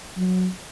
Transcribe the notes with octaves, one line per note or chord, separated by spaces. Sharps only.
F#3